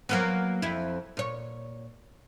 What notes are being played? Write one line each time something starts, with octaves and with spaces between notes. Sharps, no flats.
F#3 A#3 B3
F2 E4
A#2 C#5